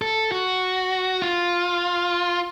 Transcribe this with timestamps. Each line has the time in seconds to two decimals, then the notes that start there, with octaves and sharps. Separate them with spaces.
0.02 A4
0.32 F#4
1.22 F4